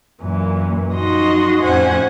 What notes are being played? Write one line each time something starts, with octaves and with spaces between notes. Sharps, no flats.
F#2 A#2 E3
F#2 F3 D#4 F#4 D#5 C6
F2 A2 C#4 C5 F#5 G#5